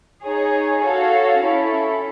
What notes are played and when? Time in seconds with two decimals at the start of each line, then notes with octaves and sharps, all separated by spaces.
0.23 D#4 G#4 C#5
0.82 F#4 A4 C#5 F5
1.42 C#4 E4 A4